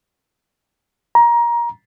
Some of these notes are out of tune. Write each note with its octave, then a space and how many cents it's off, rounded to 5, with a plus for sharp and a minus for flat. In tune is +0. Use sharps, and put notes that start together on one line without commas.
A#5 +20